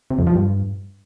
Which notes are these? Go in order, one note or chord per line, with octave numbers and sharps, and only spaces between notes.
C3
F2
F3
G2